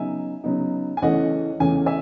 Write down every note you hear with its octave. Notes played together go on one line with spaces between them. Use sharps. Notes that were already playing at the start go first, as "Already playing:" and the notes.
Already playing: C#3 F#3 B3 D#4 E5 G#5
C#3 F#3 B3 D#4
G#5
E2 C#3 E3 A3 C#4 D#5 F#5
E2 C#3 E3 A3 C#4 G#5
E5 G#5